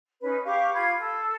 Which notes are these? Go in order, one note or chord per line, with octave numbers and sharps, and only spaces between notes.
C#4 D#4 B4
G4 F5 C#6 D6
F4 B5 G#6
A4